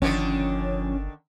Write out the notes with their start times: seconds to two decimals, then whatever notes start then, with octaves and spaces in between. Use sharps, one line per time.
0.02 G1 D3 D#3 F3 C#4 D4